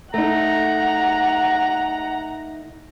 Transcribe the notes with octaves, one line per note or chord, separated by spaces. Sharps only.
A3 D#4 F#5 A#5